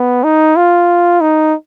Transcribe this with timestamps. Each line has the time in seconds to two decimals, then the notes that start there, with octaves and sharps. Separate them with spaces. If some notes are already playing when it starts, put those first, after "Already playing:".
Already playing: B3
0.24 D#4
0.56 F4
1.21 D#4